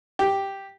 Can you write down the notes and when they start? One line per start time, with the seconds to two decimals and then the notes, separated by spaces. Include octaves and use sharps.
0.19 G4